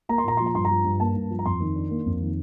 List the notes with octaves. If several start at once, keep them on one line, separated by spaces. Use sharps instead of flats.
A#3 A#5
C6
A#2 A#5
F3 C6
A#5
G2 C6
A#5
F3
G2
A#3 A5
G2
F3
A#5
F2 C6
D#3
D4
A#3
F2
D#3